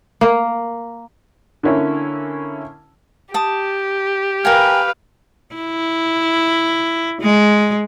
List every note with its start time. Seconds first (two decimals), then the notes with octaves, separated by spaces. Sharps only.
0.21 A#3
1.63 D3 A#3 C#4 E4
3.34 G4 A5 D#6
4.45 A#4 B4 F5 G5 G#5
5.55 E4
7.21 G#3